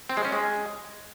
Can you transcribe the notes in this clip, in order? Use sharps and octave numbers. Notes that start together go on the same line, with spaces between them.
C4
G#3
C#4
G#3